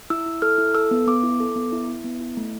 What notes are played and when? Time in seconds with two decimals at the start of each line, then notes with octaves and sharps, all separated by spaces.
0.10 E4 E6
0.26 E4
0.42 A4 F6
0.58 E4
0.75 A4 E6
0.91 B3
1.07 B3 D6
1.23 E4
1.40 A4
1.56 B3
1.72 E4
1.89 E4
2.04 B3
2.21 E4
2.37 A3